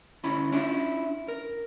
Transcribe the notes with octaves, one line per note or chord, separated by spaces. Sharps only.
D2 C#4 E4 B5
C#4 D4 E4 F4 E5
A#4